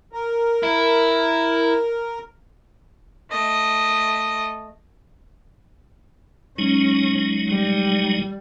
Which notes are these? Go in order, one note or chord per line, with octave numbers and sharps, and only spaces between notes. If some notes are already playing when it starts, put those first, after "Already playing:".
A#4
E4
A3 D#5
F#3 G#3 C#4 D#4
G3